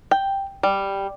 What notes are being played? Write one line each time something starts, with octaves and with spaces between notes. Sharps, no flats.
G5
G3